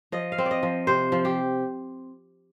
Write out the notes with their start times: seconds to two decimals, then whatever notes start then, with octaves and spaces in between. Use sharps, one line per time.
0.12 F3 D#5
0.32 F5
0.38 C4
0.46 D5
0.51 D#5
0.63 F3
0.87 C3 C5
1.12 F3
1.25 G4